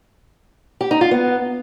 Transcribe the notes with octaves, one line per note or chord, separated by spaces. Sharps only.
G4
D#4
F4
B3